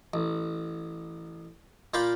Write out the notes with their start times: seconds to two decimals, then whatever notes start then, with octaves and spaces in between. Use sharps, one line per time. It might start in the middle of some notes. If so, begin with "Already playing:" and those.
0.14 A1
1.94 A#2 F4 F5 G5 B5 D6